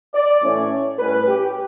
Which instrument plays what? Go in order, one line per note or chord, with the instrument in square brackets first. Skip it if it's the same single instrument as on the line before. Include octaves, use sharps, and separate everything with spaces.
[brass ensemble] D5
A2 E3 A3 C#4 C#5
A2 G3 C#4 B4
G4